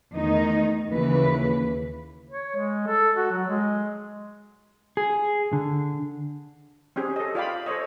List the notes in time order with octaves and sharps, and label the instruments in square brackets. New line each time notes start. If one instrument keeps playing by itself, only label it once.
[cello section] E2 D#3 A3 D#4 D#5
D#2 C#3 E3 B4
[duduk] C#5
G#3
A4
F#4
F#3
G#3
[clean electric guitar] G#4
D3
[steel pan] C4 C#4 G4 G#4
A4 D#5
F4 D5 F5 G5 B5
A4 C5 C#5 D#5